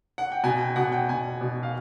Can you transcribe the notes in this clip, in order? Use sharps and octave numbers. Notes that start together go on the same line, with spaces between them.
F#5
G5
B2 G#5
G5
B2 F#5
G5
B2 G#5
B2
F5